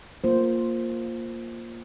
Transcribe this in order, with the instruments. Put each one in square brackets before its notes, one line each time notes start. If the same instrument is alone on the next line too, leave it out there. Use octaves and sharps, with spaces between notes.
[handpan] A#3 F4 C5